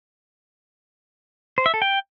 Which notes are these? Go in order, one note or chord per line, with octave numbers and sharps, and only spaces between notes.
C5
E5
A4
G5